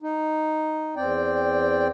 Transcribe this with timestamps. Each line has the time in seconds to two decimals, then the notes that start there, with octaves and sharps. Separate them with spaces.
0.02 D#4
0.96 E2 C4 D5 G5